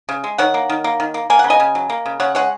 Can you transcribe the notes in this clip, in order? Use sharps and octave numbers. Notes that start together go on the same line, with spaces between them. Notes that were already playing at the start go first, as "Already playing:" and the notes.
C#3
G#3
D#3 C#5 F#5
A#3
D#3
A#3
D#3
A#3
A#3 G#5
C#3 F#5
D#5 G#5
C#3
F#3
A#3
C#3
C#3 C#5 F#5
G#3 C#5 F#5